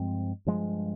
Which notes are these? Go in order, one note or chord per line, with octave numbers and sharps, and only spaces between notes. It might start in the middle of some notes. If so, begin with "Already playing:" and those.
Already playing: G2 F3 G#3 C4
G2 F3 G#3